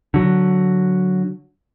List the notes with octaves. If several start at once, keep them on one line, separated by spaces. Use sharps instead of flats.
D3 F#3